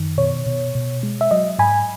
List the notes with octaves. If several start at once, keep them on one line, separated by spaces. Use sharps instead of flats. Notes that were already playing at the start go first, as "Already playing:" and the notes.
Already playing: F#2 D#3
B2 C#5
B2
B2
G#3
E5
F#3 D#5
G#2 G#5 B5